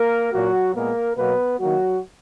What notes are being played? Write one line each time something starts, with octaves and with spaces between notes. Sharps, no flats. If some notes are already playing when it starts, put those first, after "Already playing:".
Already playing: A#3 A#4
A#2 F#3 A#3 F#4
A#2 G#3 A#3 B3 A#4
B2 F#3 A#3 B3 B4
D#3 F#3 A#3 F#4